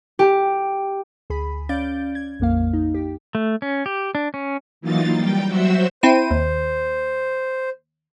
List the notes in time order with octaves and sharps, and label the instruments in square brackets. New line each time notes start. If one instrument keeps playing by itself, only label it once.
[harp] G4
[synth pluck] D2 G#4 B5
C#4 D5 F5 G6 A6 D7
G#6
A#1 F2 A#3 F5
D#4
G4
[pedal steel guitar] A3
C#4
G4
D4
C#4
[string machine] E3 F#3 A#3 D#4 F4 A6
G3 G5
F#3 F#4 C5 E5 E6
[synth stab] C4 E4 D#7 [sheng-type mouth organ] C5
[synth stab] D#2